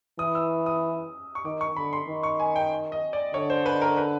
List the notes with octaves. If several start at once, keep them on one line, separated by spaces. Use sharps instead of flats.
E3 D#6
E6
D#6
C#6
D#3 D6
C#6
D3 B5
C6
D#3
C#6
G#5
G5
D#5
D5
D3 C#5
C5
B4
A#4
B4